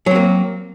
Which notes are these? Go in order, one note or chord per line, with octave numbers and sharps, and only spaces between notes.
F#3 A#3 C4